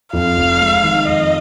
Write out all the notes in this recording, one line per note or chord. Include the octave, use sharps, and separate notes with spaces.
F2 F5
F1
G#3
D#3
F2 D#5